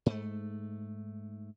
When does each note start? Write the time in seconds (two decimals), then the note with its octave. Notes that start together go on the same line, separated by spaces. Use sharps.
0.06 G#2 A3